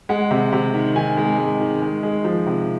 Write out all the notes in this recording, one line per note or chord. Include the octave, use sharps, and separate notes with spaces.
G#3 F#5
C3
C3
D#3
D#3 G#5
G#3
G#3
D#3
G#3
G#3
F3
C3